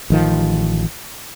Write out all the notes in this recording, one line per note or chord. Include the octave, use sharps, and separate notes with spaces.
A1 D#3 F3